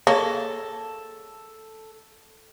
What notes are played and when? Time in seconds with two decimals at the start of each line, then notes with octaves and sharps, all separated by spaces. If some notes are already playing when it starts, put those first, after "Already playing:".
0.07 A#3 G#4 A4 C#5